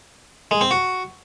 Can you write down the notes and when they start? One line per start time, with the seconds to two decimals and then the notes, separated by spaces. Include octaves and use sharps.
0.51 G#3
0.61 C4
0.71 F#4